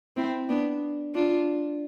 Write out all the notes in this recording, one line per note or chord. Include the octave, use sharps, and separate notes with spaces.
C4 E4
B3 D4
D4 F4